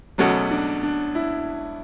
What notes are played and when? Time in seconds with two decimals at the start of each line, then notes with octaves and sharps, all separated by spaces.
0.18 E2 B2 F#3 A3 C#4 F#4
0.51 D4
0.83 D4
1.15 E4